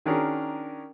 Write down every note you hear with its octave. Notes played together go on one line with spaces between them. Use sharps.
D#3 C#4 D4 F#4 G#4 A#4